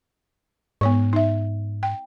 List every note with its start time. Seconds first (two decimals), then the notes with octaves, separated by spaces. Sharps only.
0.81 G#2 B3 C#5 C#6
1.13 D#4 E5
1.83 G5